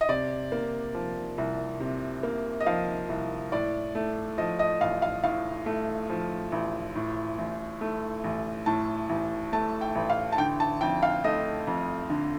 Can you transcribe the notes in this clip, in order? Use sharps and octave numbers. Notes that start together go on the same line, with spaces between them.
D#5
C3 D5
A#3
F3
C2
C3
A#3
D#5
F3 F5
C2
A2 D5
A3
F3 D#5
D#5
A1 F5
F5
A2 F5
A3
F3
A1
A2
A1
A3
A1
A2 A5
A1
A3 A5
G5
A1
F5
A5
D3 G5
A5
F2 G5
F5
A3 D#5
F2
D3